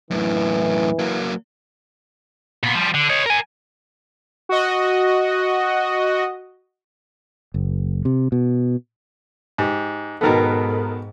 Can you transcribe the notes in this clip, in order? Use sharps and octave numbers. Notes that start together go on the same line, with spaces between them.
F#2 A2 E3
F#3 A#3
A#2 B3
F3 G3
D3
C#5 D#5
A#4 G#5
F#4 D#5
F#1
C3
B2
G#2 G4
G#2 B2 D#3 B3 A4 A#4